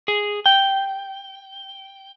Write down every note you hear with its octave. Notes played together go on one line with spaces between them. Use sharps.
G#4
G5